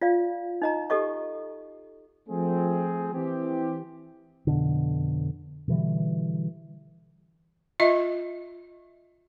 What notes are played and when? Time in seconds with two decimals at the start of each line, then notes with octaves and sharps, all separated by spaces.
0.02 F4 D5 F5
0.62 D#4 D#5 A#5
0.90 G4 A4 D#5 C#6
2.29 F3 A3 C4 G#4
3.13 E3 C4 G4
4.47 F2 B2 D3
5.68 B2 D3 E3 G3
7.80 F4 D#5 E5